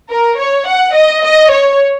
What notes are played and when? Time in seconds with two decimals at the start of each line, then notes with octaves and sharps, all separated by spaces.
0.11 A#4
0.40 C#5
0.68 F#5
0.96 D#5
1.24 D#5
1.52 C#5